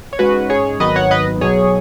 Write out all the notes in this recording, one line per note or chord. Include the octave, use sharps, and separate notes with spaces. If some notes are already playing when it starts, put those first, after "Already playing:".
C#5
G#2 G#3 C#4 F#4 B4
G#4 C#5
G#1 G#2 D#3 F#3 B3 B4 D#5
C#5 F#5
B4 D#5
B1 B2 F#3 G#4 C#5